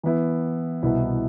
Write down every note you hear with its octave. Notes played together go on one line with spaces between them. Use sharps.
E3 B3 E4
C2 B2 B3 E4